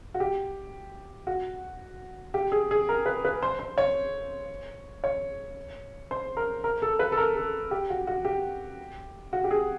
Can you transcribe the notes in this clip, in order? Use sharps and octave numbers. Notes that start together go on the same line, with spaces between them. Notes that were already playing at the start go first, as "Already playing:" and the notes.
F#4
G4
F#4
G4
G#4
G#4
A#4
B4
B4
C5
C5
C#5
C#5
C5
A#4
A#4
A4
B4
A4
A#4
A4
G4
F#4
F#4
G4
F#4
G4
G#4